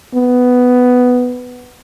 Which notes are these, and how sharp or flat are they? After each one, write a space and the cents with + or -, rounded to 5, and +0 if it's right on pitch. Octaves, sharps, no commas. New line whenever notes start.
B3 +5